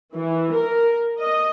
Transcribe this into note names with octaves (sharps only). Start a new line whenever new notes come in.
E3
A#4
D#5